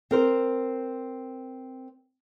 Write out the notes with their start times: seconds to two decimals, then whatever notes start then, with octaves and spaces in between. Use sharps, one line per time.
0.11 C4 A#4 C5